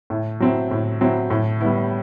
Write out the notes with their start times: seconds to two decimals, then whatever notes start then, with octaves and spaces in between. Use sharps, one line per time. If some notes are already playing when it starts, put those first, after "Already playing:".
0.10 A2
0.40 F#3 C4 E4
0.71 A2
1.01 F#3 C4 E4
1.30 A2
1.60 G3 B3 E4